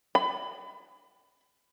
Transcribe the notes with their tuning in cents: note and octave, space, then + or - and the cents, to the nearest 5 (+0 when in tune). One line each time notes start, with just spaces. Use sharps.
B5 +30